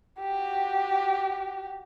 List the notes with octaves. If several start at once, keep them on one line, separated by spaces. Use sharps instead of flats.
F#4 G4